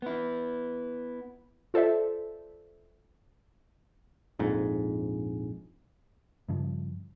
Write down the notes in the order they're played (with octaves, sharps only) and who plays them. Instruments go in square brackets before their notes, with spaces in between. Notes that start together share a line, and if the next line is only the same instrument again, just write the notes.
[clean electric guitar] B3 E4
[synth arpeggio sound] F4 A4 C5 D5 E5
[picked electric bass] A#1 F2 G#2
G2 C#3 F3